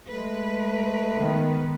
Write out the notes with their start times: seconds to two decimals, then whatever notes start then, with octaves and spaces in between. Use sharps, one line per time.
0.10 G#3 A3 B4
1.17 D#3 B3